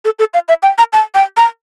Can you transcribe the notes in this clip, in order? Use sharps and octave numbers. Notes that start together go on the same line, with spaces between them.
A4
A4
F5
E5
G5
A#5
A5
G5
A#5